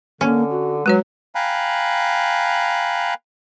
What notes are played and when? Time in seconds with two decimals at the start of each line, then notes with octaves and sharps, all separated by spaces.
0.21 D3 A#3 C#4
0.50 F#4
0.86 F#3 G#3 F#4 B4 C#5
1.35 F5 G5 G#5 A#5 B5 F#6